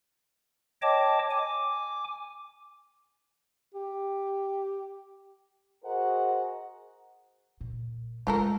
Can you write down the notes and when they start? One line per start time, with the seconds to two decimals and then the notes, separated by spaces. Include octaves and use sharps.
0.82 C#5 D#5 G5 A5 D6
1.30 G#5 D6
3.74 G4
5.84 F#4 G#4 A#4 C5 D#5 F#5
7.61 A#2
8.27 G#3 A3 F4 A4 A#4